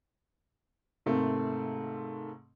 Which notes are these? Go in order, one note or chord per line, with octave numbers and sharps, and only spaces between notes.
G#2 C3 D#3 A3 A#3 C4